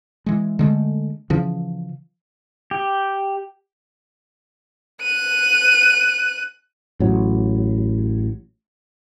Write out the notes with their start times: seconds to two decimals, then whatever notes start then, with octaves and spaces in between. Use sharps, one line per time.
0.26 E3 G#3
0.59 D3 G#3 A3
1.30 C#3 E3 F3
2.71 G4
5.02 F#6 D#7
7.00 A1 F#3